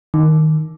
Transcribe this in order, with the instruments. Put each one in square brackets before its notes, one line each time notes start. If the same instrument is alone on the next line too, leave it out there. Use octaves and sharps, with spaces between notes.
[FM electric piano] D#3